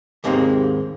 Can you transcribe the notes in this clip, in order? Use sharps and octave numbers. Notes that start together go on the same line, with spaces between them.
D#2 G#2 C3 G#3 A#3 C4